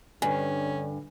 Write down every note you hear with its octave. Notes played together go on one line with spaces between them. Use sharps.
G2 D3 C#4 G#5